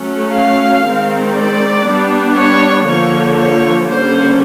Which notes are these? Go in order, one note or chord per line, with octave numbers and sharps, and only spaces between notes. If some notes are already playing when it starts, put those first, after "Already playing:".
Already playing: F#3 A3 C#4
F5
D#3 G#3 C4
D5
G3 B3 D4
C#5
D3 F3 A#3 C#5
C#5
D3 G3 A#3 C#4 C5